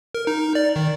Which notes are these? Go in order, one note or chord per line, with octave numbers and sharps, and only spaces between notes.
A#4
D#4
D5
D#3